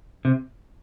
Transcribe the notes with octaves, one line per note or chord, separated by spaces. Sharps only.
C3